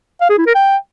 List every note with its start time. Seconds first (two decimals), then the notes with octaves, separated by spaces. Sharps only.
0.21 F5
0.30 G#4
0.38 E4
0.46 A#4
0.55 G5